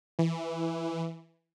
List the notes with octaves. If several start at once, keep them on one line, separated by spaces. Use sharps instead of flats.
E3